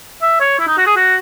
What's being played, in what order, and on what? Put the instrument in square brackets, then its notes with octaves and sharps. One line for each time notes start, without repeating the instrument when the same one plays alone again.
[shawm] E5
C#5
E4
D#4
F#4
G#4
F#4